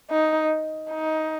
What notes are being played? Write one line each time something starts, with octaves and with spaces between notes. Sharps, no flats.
D#4
D#4